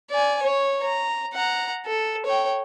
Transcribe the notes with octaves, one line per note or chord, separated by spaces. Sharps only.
D5 G#5
C#5
A#5
F#5 A#5
A4
C#5 G5